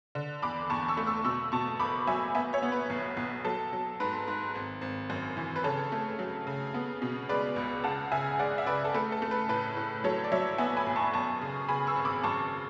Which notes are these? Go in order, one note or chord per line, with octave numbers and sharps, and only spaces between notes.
D3
E2 B5 D6
E2 A5 C#6
C#6 E6
A3
C#6 E6
B2 C#6 E6
B2 A5 C#6
F#1 B5 D6
F#3 E5 G#5
B3 E5 G#5
C#5 E5
B3
B4
B1
B1
F#3 A4
F#3
G#2 B4
G#2
G#1
G#1
F#2
E3
B4
C#3 A4 C#5
A3
F#3
C#3
B3
B2
G#3 B4 D5
C#2
C#3 F#5 A5
C#3 E5 G#5
G#3 D5 F#5
E5
C#3 B4 D5
A4
A3 B4
A4
A3
B4
A2 B4
A2
F#3 A4 C#5
D5
F#3 C#5 E5
B3 E5 G#5
G#5 B5
B1
A5 C#6
F#2 A5 C#6
C#3
C#3 G#5 B5
C#6 E6
G#1
B5 D6
F#2 A5 C#6